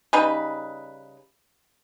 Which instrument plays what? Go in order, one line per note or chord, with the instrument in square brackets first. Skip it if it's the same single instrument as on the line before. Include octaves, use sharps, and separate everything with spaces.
[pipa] C#3 G3 D#4 B4